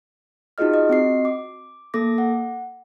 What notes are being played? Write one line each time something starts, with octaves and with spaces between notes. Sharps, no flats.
D#4 F4 F#4 G#4 D#5 F6
D#5
C4 F#4 D#5 C7
D6
A#3 A4 D6 A#6
F#5